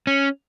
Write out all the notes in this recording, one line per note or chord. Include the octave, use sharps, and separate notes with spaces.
C#4